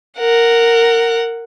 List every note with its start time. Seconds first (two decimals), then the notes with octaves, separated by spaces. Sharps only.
0.18 A#4 F#5